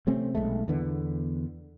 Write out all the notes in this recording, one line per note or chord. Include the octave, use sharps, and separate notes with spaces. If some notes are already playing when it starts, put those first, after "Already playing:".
C3 A3 C4 C#4
B1 F2 G#3 A3
E2 D3 B3